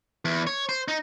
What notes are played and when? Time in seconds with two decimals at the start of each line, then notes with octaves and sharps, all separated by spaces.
0.25 E2
0.47 C#5
0.69 C5
0.88 D#4